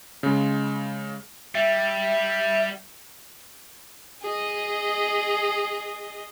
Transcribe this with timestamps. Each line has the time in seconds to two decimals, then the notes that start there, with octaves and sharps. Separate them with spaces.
0.23 C#3 G#3
1.55 G3 E5
4.22 G#4 D#5